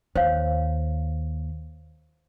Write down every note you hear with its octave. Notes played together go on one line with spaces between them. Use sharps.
D#2 C5 C#5 F5